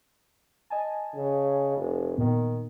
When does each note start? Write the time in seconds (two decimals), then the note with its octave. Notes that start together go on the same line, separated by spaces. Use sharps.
0.70 D#5 G#5 A5
1.16 C#3
1.77 F1
2.17 A#2 D#3 B3